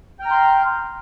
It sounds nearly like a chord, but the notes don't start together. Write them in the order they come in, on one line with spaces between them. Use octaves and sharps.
G5 F6 A#5 G6 C6